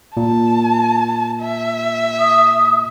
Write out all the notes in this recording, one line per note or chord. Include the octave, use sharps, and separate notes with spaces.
A#2 A5
E5
D#6